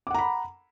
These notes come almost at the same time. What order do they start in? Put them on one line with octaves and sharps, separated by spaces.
D6 F#5 A#5 B5